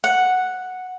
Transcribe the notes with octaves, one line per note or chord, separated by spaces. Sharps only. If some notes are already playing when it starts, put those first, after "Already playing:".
F#5